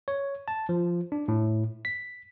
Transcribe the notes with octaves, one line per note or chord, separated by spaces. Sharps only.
C#5
A5
F3
D4
A2
B6